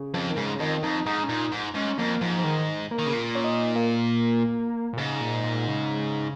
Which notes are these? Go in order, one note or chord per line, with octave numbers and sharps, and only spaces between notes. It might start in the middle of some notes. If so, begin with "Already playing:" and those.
Already playing: C#3
F2
D#3
G#2 C#3
C#3
F2 D#3
F2 D#4
G#2 D#4
C#4
A#2 D#4
G#2
G#2 C#4
F2 A#3
G#2 F3
F3
D#3
A#3
D#3
C#3
A#2
C#4
D#4
A#3
A#2
G#2 C#3
A#2
A#2
C#3